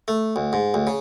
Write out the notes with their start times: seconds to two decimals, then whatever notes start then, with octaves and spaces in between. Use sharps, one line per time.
0.08 A3
0.36 D2
0.53 G#2
0.74 D2
0.87 C#3